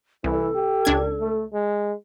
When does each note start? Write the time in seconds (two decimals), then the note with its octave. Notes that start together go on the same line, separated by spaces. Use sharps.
0.24 C2 E3 A4
0.55 G4
0.85 C#2 D4 G#6
1.21 A3
1.53 G#3